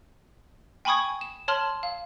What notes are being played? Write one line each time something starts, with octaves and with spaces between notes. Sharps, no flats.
G5 G#5 B5 C#6 D#6 G#6
E7
C#5 A5 C6 F6 F#7
F5